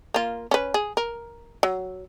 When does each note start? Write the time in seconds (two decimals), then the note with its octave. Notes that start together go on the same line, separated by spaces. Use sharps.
0.14 A#3 F4
0.51 C#4 B4
0.74 G#4
0.97 A#4
1.63 F#3